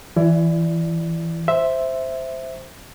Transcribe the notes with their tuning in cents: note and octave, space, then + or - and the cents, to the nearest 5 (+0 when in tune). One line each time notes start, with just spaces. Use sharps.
E3 +0 E4 +30 D5 +0
C5 +0 E5 +0